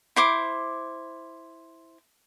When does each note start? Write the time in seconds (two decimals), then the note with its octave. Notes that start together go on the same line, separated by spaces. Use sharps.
0.16 E4 C5 D6